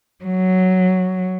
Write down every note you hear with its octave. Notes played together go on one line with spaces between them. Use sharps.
F#3